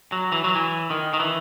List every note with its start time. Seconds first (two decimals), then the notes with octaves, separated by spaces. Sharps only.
0.12 F#3
0.32 E3
0.44 F#3
0.55 E3
0.90 D#3
1.14 D#3
1.20 E3